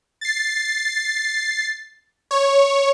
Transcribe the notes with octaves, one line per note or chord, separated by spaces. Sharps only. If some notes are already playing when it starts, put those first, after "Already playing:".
A6 C7
C#5